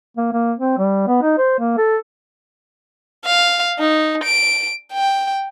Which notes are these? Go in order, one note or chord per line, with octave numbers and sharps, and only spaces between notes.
A#3
A#3
C4
G3
B3
D#4
C5
A#3
A4
F5
D#4
D7
G5